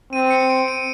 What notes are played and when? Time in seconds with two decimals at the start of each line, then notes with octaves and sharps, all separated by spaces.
0.12 C4 D#7
0.30 C#7
0.50 D7
0.68 D#7